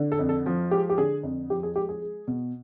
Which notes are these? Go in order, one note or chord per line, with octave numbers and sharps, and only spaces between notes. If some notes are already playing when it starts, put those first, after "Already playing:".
Already playing: D3
A4
F2
A4
F3
G#3 G4
G4
D3 G#4
F2
F3 G4
G#4
G#3 G4
G#4
G#3
B2